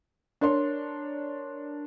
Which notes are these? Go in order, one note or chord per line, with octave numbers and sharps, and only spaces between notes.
D4 A#4 C#5 C6